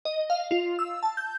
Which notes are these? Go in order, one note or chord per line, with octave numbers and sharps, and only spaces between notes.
D#5
F5
F4
E6
A5
G6